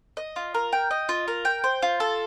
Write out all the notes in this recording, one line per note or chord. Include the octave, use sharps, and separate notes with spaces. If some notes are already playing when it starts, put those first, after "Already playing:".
D#5
F4
A#4
G5
D#5
F4
A#4
G5
C5
F4
A4